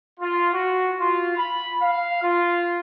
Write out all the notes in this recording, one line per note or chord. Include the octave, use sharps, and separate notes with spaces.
F4
F#4
F4
B5
F5
F4